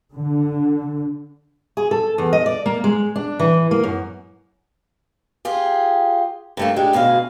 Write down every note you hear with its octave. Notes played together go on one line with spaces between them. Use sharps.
D3
G#4
A4
E2
D#5
D5
A#3
G#3
D4
E3
A#3
F#2
F4 G4 G#4
G2 A3 A#3
G#3 D4 G4
D2 B2 G#4 F5